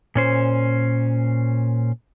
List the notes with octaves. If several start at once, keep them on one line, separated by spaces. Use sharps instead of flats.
A#2 C#4 C5